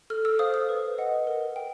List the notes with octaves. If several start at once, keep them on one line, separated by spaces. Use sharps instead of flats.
A4 F6
E6
C5 F5 D#6
D#6
B4
D#5 F#5
A#4
G5